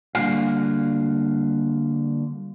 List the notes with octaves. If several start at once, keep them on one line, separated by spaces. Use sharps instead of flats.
D3 G3 A#3 F#4 F5